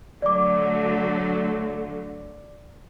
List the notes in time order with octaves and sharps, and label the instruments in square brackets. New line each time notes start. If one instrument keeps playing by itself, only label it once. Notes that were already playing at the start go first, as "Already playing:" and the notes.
[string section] D3 F#3 A3 [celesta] D5 D6